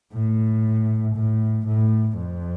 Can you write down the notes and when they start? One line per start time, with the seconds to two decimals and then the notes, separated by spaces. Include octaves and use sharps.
0.13 A2
1.15 A2
1.66 A2
2.17 F2